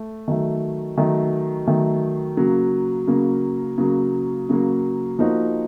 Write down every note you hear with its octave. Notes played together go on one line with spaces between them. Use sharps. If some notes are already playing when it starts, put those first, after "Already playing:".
Already playing: A3
D#3 F#3 A3
D#3 F#3 A3
D#3 F#3 A3
C#3 F#3 A#3
C#3 F#3 A#3
C#3 F#3 A#3
C#3 F#3 A#3
F3 A#3 D#4 F#4